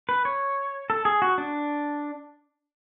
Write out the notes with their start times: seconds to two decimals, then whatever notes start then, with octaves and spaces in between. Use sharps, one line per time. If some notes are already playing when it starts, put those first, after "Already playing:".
0.09 B4
0.25 C#5
0.90 A4
1.05 G#4
1.22 F#4
1.38 D4